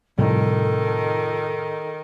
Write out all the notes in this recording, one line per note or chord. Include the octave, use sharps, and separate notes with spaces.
F2 A2 C3 D#3 G3 A4